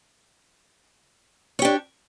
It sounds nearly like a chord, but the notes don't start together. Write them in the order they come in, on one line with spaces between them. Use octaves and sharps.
C#5 G4 D4